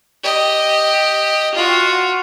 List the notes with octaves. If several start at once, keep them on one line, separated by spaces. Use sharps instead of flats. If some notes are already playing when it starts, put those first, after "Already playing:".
G4 D#5
F4 F#4